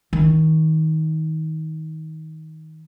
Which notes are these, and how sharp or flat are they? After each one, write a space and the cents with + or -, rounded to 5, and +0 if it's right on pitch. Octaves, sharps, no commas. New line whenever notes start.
D#3 +25